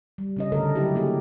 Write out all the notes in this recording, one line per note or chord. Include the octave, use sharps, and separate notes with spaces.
G3
C#3 C#4 D#5
D3 A3 A4 A#4 D#5
F#3 E4 G4
A#3 G4 G#4